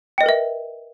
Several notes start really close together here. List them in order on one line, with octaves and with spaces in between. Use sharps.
G5 D#5 B4 A#4 E5